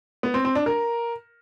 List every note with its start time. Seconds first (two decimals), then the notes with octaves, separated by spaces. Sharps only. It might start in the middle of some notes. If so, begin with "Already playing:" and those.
0.23 B3
0.34 C4
0.45 C4
0.55 D4
0.66 A#4